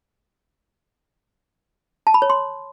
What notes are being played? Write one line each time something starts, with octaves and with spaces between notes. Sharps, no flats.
A5
B5
C#5
C6